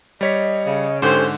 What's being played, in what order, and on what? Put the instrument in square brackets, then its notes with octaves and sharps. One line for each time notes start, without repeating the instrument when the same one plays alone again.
[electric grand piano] G3 C#5 B6 [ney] D#5
[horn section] C#3
[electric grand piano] G#2 D3 [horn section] C#4 G4 C5 [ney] A4